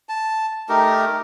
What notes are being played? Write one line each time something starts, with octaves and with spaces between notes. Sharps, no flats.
A5
A3 D#4 G4 A#4